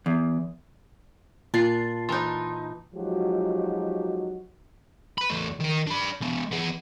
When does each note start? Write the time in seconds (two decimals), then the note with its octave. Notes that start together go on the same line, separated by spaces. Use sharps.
0.06 E2
1.54 A#2 F4 A5 A6 C7
2.09 E3 D#4 A5 C6
2.95 F3 F#3 G#3 D#4 F#4 G4
5.18 B4 B5
5.29 E2 A3
5.60 D#3 A#4
5.87 D4 B5
6.22 G#3 B3
6.52 B3 G#4